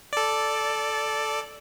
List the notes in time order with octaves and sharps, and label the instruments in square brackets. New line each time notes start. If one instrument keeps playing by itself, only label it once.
[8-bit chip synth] A4 D5